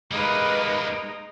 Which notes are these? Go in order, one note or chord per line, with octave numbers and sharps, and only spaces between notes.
G3 G#3 A#3 D#4 B4 D#5